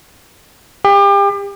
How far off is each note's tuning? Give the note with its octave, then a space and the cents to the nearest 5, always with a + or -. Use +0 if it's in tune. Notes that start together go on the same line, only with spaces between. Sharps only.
G4 +35